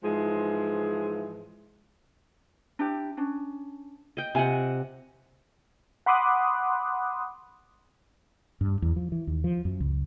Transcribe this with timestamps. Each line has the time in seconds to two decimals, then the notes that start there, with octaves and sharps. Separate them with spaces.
0.03 G#2 E3 F3 G#3 G#4
2.79 D4 E4 G4
3.17 C#4 D4
4.17 D#5 G5
4.35 C3 F4 F#5 G#5
6.06 F#5 B5 C6 D6 D#6 F#6
8.61 G2
8.82 E2
8.96 F3
9.12 E3
9.27 D#2
9.44 F3
9.65 F#2
9.80 C#2